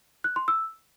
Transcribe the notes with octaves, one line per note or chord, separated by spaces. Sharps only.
F#6
C6
E6